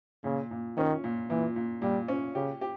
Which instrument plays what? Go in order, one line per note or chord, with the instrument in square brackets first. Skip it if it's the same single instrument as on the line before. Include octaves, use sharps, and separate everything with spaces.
[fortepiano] A#2 [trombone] C#3
[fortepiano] A#2
[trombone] D#3 [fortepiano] C#4
[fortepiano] A#2
[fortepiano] A#2 [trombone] E3
[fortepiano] A#2
[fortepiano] A#2 [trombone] G3
[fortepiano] C#4
[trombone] C#3 [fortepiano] G4
[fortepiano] G4